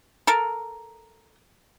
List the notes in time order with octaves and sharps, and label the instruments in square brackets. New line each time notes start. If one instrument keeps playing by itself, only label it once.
[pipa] A4 A#4